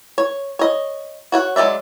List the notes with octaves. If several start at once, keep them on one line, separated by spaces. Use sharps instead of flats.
C#5
C#5 D#5
F#4 C#5 F#5
F#3 G#3 C4 D5 E5